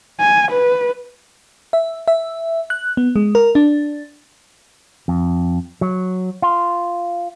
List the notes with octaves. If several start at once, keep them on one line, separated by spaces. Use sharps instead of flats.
G#5
B4
E5
E5
F#6
B3
G#3
A#4
D4
F2
F#3
F4